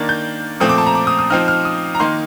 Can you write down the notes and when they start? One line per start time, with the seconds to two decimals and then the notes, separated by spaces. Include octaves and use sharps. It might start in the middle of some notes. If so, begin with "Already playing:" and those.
Already playing: D#3 A#3 D4 A6
0.09 G6
0.60 A#2 F3 A3 C4 D#6
0.69 D6
0.78 A5
0.86 A#5
0.95 D6
1.07 D#6
1.19 D#6
1.30 F3 C4 D#4 F6
1.48 F6
1.65 D#6
1.95 A#5
2.00 D#3 A#3 D#4 C6